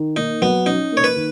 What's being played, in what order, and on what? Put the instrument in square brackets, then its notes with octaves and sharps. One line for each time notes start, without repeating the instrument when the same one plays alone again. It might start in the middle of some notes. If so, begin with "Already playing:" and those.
Already playing: [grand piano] D#3
[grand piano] A#3 [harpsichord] D#4
[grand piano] F#3 [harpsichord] B3
[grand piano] C#4 [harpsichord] D#4
[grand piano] A#3 [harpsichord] C#5
[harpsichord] B4
[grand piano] D#3